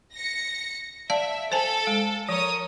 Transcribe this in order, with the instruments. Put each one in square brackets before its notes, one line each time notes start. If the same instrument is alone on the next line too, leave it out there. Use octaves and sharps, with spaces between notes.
[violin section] A#6 C#7
[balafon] D5 F5 A5 [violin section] E5
[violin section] A4 [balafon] C5 G#5 A5
[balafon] G#3
[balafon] F3 [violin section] A#4 C#5 D#6